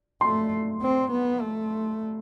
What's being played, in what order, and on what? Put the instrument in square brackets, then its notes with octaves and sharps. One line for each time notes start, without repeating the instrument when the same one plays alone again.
[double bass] A3 [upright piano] C6
[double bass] C4
B3
A3